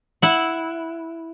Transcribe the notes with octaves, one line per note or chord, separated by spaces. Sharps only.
E4 F#5